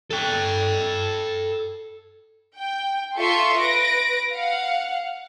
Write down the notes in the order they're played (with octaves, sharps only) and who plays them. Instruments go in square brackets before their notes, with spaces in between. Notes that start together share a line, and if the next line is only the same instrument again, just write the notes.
[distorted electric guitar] A4 G5
[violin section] G5
F4 A4 E5 C6 C#6
B4 A#6 D7
F5 F#5